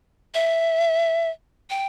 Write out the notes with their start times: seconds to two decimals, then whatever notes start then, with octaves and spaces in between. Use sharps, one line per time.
0.34 E5
1.70 G5